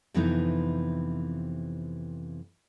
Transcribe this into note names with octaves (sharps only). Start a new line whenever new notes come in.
F2 C3 E3 B3 D#4 E4